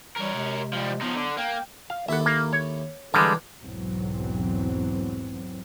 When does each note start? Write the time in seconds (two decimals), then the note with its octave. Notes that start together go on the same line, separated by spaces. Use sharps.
0.17 E3 G3 A#4 C#5
0.34 C3 G#3
0.73 F3 G3
1.01 F3 F#3 B3 D#4
1.15 D3
1.37 A#3 G5
1.90 F5
2.09 D#2 E4 A4 E5 F#5
2.26 A#3
2.53 C#5
3.14 D3 E3 G3 G#3 D5
3.61 B1 E2 G#2 E3 F#3 C4